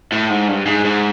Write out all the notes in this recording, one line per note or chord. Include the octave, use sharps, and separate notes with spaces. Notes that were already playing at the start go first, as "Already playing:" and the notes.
A2
G#2
G2
G#2
G#2